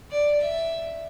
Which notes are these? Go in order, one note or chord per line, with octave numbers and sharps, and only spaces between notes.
D5
E5